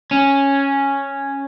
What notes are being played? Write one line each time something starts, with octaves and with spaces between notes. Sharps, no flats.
C#4